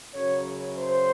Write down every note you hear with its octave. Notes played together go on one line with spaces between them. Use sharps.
F#2 C#3 F#3 C#5
C5